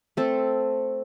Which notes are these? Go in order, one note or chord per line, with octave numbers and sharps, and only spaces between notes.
A3 C4 A4